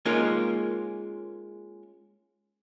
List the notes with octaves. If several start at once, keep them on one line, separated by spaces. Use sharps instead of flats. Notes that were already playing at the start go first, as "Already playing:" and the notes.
G#3 A#3 C#4 D#4 F4 A#4